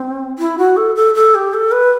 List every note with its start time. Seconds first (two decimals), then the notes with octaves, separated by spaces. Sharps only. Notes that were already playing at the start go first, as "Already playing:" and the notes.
Already playing: C4
0.39 E4
0.58 F#4
0.77 A4
0.96 A4
1.15 A4
1.35 G4
1.54 A4
1.72 B4